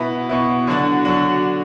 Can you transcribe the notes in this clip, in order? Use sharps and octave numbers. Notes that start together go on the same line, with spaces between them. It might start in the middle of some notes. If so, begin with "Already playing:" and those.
Already playing: B2 B3 E4
B2 B3 E4
D3 F#3 D4 F#4
D3 F#3 D4 F#4